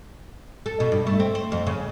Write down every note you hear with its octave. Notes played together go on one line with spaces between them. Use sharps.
A4
B2
G2
A3
C4
C5
F2
C#3